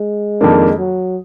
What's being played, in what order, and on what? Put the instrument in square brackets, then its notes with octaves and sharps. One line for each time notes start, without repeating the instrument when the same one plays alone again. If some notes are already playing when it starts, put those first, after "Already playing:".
Already playing: [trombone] G#3
[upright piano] F2 D#3 A#3 D4
[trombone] F#3